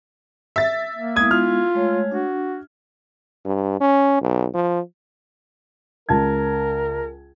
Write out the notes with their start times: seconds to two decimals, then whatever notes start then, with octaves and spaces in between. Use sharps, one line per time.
0.56 E5 A6
0.96 A#3
1.16 G#3 B3 E4 D#6 G#6
1.31 F4 F6
1.75 G#3 A3 C#5
2.11 D4 F#4
3.45 G2
3.81 C#4
4.21 B1
4.54 F3
6.09 C#2 A#4 A5 G#6